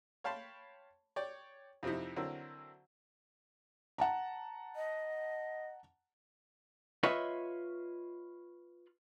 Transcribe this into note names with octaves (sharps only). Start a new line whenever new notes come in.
C#5 F5 G5 A5 B5 C6
C#5 D5 G5
F2 C3 C4 D#4 E4
D3 F#3 C4 E4 A#4
F#5 A5 A#5
D#5
F4 B4 C#5 D#5 E5